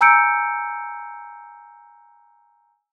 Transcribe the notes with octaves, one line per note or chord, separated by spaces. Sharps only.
G#5 A#5 E6 G6 C#7 D7